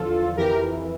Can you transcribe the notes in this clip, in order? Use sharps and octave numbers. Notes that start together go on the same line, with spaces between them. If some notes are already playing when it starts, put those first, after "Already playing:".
Already playing: E2 D3 F3 F4 A4
F2 E3 G4 A#4